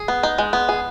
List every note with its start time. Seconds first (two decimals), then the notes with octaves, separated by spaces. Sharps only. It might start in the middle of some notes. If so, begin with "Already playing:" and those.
Already playing: G#4
0.08 B3
0.23 D#4
0.38 G#3
0.53 B3
0.69 G#4